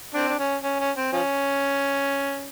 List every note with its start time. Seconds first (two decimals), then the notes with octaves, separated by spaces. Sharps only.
0.14 C4 D4
0.28 D4
0.39 C#4
0.63 C#4
0.79 C#4
0.97 C4
1.13 F3 C#4